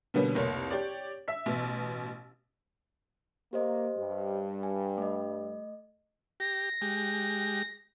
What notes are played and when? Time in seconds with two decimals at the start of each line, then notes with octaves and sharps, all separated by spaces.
0.14 B2 D3 G3 A#3 B3 C#4
0.35 F1 C2 A#3 C#5
0.70 G4 C#5 D5
1.28 E5 E6 B6
1.46 A1 B2
3.53 A#3 G4 C5 D#5
3.97 G2 G3
4.63 G#5
4.98 A3 D#5
6.40 G4 A#6
6.81 G#3 G4